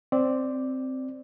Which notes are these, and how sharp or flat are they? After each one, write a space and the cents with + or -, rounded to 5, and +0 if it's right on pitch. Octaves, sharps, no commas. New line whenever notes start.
C4 +0 D5 +0